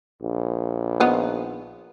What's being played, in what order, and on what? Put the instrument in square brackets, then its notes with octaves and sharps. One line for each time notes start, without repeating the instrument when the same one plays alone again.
[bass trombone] A#1
[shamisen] D#3 B3 F4